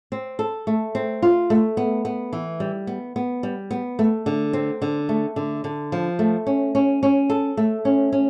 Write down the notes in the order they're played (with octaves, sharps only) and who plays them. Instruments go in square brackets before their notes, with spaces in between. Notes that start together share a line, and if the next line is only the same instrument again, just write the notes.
[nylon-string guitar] C4
A4
A3
C4
F4
A3
B3
B3
E3
G3
B3
B3
G3
B3
A3
D3
C4
D3
A3
D3
D3
F3
A3
C#4
C#4
C#4
A4
A3
C#4
C#4